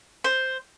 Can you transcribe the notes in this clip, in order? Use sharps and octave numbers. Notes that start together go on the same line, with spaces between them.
C5